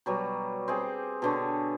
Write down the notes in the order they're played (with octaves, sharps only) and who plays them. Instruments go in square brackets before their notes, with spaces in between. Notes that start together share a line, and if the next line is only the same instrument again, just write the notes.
[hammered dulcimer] B2 F#3 G3
C4 G4 G#4
B2 D3 C#5